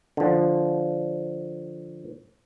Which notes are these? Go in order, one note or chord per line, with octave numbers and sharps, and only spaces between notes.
D3 F3